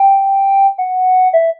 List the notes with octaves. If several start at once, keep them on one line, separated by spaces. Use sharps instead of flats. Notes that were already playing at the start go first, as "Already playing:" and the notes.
Already playing: G5
F#5
E5